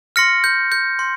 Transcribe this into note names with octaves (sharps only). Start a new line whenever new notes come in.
C6 F6 A#6 C#7
G6
G6
C6